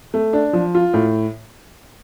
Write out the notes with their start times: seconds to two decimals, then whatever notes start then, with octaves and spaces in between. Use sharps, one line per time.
0.14 A3
0.33 D4
0.53 F3
0.75 F4
0.94 A2